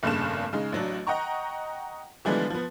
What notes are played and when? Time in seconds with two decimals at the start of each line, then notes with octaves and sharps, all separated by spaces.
0.03 F1 G2 A#2 C#3 A4 E7
0.53 C#3 G#3 D#4
0.72 A1 F#3 D4
1.07 D#5 F#5 G5 A#5 C#6
2.25 D3 E3 F3 G3 G#3 B3
2.50 F3 B3